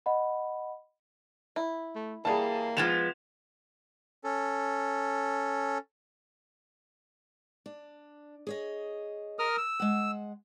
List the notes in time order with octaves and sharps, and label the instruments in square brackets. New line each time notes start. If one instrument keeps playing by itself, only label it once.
[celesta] D#5 F#5 B5
[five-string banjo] E4
[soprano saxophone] A3
[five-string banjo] E3 G3 [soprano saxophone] A#3 [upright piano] G#4 A5
[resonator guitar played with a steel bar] F3 G#3 B3 [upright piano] A6 E7 F7
[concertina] C#4 A4
[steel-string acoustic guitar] D4
G#4 C#5 D#5
[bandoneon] A#4 D#6 F6
E6
[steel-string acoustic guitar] G#3 F#5